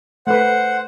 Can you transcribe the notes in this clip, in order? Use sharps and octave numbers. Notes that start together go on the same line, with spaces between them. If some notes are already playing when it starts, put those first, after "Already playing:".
A3 B4 C5 F#5